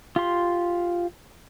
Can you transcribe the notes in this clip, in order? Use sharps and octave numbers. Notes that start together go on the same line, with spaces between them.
F4 G4 C6